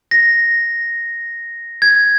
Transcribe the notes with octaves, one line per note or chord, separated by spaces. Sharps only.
A#6
G#6